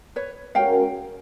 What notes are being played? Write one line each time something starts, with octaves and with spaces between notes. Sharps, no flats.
B4 C#5
G#3 C#4 F#4 A#4 F5 G5